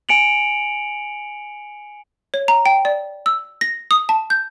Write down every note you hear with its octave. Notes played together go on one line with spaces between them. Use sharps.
G#5 C#7 D7 F7 F#7
C#5
A#5
G5
D5
E6
A#6
D#6
A5
G6